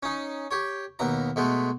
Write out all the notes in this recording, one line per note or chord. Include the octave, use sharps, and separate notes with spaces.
C#4 D#4
G4 C#5
D#2 B2 A#5
B2 G#3 A3